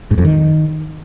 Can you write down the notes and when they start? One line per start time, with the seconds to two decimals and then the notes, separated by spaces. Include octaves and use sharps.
0.11 G#2
0.18 F2
0.25 D#3